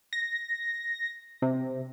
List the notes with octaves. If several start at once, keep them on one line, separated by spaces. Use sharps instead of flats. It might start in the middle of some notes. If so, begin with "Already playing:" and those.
A#6
C3